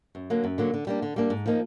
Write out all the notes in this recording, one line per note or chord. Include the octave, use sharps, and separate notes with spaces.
F#2
D3 F#3 A#3
F#2
D3 F#3 A#3
D3
G3 A#3 D4
D3
G3 A#3 D4
G#2
F3 A#3 D#4